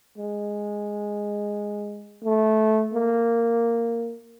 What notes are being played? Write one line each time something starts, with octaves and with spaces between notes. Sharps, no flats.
G#3
A3
A#3